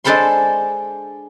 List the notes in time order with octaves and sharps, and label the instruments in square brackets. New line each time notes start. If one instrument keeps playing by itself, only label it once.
[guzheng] G#3 D4 A4 C5 B5 C6